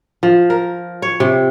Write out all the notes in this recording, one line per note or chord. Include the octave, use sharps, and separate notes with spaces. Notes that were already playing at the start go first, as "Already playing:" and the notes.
F3
A#4
C#5
C3